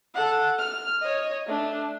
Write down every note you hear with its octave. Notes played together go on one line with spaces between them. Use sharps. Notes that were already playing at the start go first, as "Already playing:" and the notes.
A4 F#5
F6
C#5 D#5
A3 D4